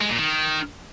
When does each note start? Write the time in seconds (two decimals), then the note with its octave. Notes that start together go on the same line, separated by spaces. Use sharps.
0.01 G#3
0.09 A#2
0.18 D#3